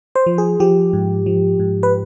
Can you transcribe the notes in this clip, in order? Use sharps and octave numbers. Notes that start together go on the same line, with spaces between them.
C5
F3
G#4
F3 G4
G#2
F3
G#2
B4